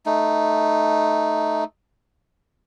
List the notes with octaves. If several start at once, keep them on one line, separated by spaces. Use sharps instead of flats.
A3 D#4